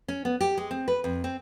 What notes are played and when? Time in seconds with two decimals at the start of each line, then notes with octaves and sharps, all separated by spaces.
0.08 C#4
0.25 B3
0.41 G4
0.57 G#3
0.71 C4
0.88 B4
1.04 F2
1.24 C4